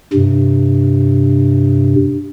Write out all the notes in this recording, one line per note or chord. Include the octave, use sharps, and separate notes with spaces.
G2 C3